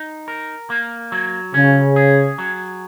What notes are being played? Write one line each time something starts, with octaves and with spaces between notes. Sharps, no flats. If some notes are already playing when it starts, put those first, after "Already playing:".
Already playing: D#4
A#4
A#3
F#3
C#3 C#4
G#4
F#3